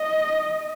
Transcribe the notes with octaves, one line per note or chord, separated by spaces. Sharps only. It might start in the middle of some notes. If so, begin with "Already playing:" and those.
Already playing: D#5